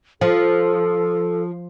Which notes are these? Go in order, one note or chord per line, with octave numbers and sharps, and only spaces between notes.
F3 A4